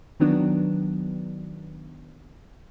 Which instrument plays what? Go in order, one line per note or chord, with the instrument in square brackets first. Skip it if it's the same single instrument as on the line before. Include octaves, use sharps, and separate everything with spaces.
[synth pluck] D#3 F#3 B3 D4